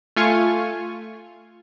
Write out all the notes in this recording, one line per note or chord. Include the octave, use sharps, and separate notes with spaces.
A3 F4 G#5 C#6